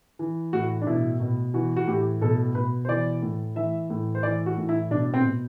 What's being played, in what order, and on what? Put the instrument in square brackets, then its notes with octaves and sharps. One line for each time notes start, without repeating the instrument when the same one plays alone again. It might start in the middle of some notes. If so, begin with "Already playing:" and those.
[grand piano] E3
A2 F#4
D4
B2 E4
B2
E3 F#4
F#4
A2 G4
B2 A4
B2 B4
C5
E3 D5
A2
E3 E5
A2
C5
E3 D5
F#4
A2
E4
B2 D4
C4
B2